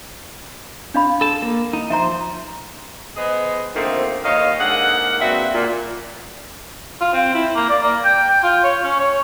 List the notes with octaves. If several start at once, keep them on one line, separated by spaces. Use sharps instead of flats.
D4 F5 B5
A4 A5
A#3
D#4
F3 C5 E5 A#5
B3 G#4 C5 D#5
D3 D#3 F3 A3 A#3 C4
D#2 B2 D#3 C#5 D#5 F5
G#2 D3 A#3 G#4 F#5
A#3 C4 D4 F#4 B4 E5
A#2
F4
C4
E4
A#3
D5
A#3
G5
G5
F4
C#5
C#4
C#5